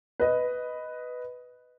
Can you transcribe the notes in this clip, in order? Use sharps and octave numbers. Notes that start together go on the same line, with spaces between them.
B4 D#5